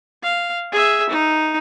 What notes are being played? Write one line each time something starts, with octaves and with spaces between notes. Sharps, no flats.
F5
G#4 E5
D#4